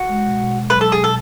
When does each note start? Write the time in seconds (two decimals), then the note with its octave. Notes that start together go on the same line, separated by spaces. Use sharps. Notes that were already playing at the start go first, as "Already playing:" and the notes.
Already playing: F#4
0.09 G#3
0.24 B2
0.40 B2
0.55 B2
0.70 F#3 B4
0.81 F#3 A4
0.92 G#4
0.99 B2 A4